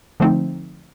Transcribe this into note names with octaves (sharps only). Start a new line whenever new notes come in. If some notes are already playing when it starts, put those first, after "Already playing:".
D3 F3 A3 C4 D#4